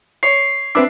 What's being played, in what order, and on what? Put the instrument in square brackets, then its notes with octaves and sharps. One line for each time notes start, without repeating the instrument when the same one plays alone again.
[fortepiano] C#5 [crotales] C7
[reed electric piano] C4 B4 D6 [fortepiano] D4 E5